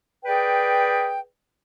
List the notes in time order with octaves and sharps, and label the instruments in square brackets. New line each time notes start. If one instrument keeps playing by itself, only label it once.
[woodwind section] G#4 B4 D5 G5